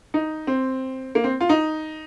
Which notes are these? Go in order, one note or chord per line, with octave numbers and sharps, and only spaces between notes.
D#4
C4
A#3
C4
F4
D#4